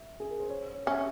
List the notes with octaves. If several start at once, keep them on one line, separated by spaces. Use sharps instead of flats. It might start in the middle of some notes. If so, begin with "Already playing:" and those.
Already playing: E5
G#4
A#4
C5
C#5
C#5
C#5
C#4 E5